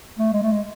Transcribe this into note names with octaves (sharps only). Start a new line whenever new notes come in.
A3
G#3
A3
G#3